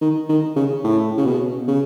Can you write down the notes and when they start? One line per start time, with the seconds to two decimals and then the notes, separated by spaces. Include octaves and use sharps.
0.01 D#3
0.29 D#3
0.56 C#3
0.84 A2
1.17 C#3
1.26 B2
1.67 C#3